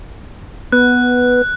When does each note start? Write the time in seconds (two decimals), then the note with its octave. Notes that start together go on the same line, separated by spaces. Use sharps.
0.72 B3 F#6